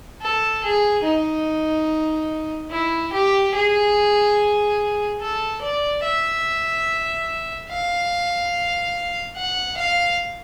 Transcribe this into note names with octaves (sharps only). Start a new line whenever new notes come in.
A4
G#4
D#4
E4
G4
G#4
A4
D5
E5
F5
F#5
F5